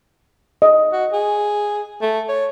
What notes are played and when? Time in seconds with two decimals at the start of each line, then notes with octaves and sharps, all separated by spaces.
0.62 D#5
0.93 F#4
1.12 G#4
2.02 A3
2.29 C#5